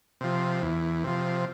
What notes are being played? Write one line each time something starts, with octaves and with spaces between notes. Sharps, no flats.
C3 F3
E2
C3 F3